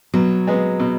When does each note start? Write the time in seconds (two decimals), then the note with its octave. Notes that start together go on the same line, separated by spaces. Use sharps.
0.14 B2 F#3
0.47 G#3 B3
0.80 B2